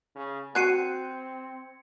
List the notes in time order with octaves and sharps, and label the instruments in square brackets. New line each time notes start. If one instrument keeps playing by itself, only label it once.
[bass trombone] C#3
[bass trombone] C4 [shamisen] F#4 G#5 [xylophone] F#6 C7 D#7 [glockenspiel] G#6 C#7